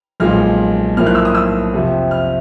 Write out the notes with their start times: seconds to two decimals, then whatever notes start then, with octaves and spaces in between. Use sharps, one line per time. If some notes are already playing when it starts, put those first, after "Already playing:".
0.20 B1 A#2 F3 G#3 F6
0.97 B1 A2 F3 A#3 F6
1.07 F#6
1.15 E6
1.25 D#6
1.35 E6
1.73 F2 C3 F3
2.11 F6